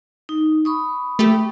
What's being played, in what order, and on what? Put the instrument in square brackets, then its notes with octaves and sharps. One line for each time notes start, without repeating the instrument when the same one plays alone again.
[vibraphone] D#4
B5 C#6 D#6
[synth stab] A3 G4